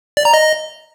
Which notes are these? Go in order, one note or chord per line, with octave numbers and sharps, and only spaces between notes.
D5
A#5
D#5